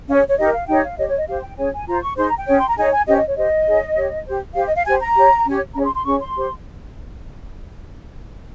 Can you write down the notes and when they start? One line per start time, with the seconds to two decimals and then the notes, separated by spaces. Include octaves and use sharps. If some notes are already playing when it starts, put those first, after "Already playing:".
0.08 C#4 G#4 C#5 F5
0.28 C#5
0.38 D#4 G4 A#4 D#5
0.53 F5
0.68 D#4 G4 C#5 G5
0.83 F5
0.98 G4 C#5 D#5
1.08 C#5
1.17 D#5
1.27 G4 C5 F5
1.42 G5
1.57 C#4 G#4 C#5 G#5
1.72 G#5
1.87 F4 C5 A#5
2.02 C#6
2.17 D#4 G#4 C5 C6
2.27 A#5
2.37 G5
2.47 C#4 G#4 C#5
2.60 C6
2.68 A#5
2.77 D#4 G#4 C#5 G#5
2.92 G#5
3.06 C#4 G4 C5 D#5
3.17 D#5
3.27 C#5
3.36 G4 C5 D#5
3.67 D#4 G#4 C#5
3.96 G4 C#5
4.26 G4 C5
4.55 G4 C5 F5
4.66 D#5
4.76 F5
4.85 G4 C5 G#5
5.01 A#5
5.16 G4 C#5
5.45 C#4 G4 C#5
5.75 C#4 G#4 C#5 A#5
5.85 C6
5.95 C6
6.05 C#4 G#4 C#5 C#6
6.20 C6
6.35 G4 C5